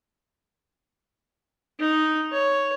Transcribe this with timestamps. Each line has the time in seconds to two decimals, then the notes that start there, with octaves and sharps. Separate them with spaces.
1.80 D#4
2.32 C#5